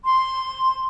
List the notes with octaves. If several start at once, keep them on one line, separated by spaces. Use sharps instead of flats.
C6